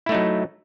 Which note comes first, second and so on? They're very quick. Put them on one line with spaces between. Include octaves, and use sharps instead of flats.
E4 A3 D#4 F#3